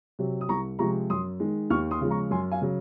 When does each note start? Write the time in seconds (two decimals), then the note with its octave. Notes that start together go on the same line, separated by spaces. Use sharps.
0.19 C3 F#3
0.41 D#6
0.49 C2 A#5 C#6
0.79 C3 F3 G#3 A#5 C#6
1.10 F#2 C6 D#6
1.40 D#3 G#3
1.70 D#2 C#6 F6
1.91 C6 D#6
2.01 C#3 F3 G#3
2.10 A#5 C#6
2.31 F#2 G#5 C6
2.51 F5 G#5
2.62 C#3 F#3